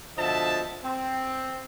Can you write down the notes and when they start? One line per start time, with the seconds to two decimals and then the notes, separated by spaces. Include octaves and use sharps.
0.17 B2 D3 F3 D#5 E5 A5
0.83 C4